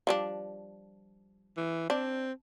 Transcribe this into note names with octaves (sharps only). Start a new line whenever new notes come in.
F3 G3 D4
E3
C4 D4